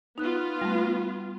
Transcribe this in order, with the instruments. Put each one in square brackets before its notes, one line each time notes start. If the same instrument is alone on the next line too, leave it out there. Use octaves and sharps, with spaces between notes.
[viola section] B3 F4 [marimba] D#4 F#6
[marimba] G3 A3